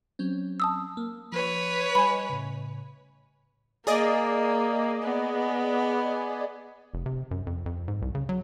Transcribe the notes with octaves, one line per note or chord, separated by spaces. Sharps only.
F#3 C4 C#4
A5 D#6 E6
A#3
F3 B4 C#5
G3 D#5 G#5 B5
A2 C#3
A#3 G#4 D5 D#5
B3
F1
C3
F#2
F2
F2
G#2
C2
C#3
F#3